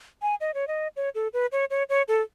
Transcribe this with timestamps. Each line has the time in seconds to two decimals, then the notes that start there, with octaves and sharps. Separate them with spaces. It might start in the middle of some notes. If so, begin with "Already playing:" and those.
0.22 G#5
0.41 D#5
0.54 C#5
0.68 D#5
0.96 C#5
1.15 A4
1.33 B4
1.52 C#5
1.70 C#5
1.89 C#5
2.08 A4